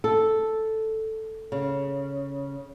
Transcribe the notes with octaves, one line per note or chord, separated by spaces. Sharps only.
A4
C#3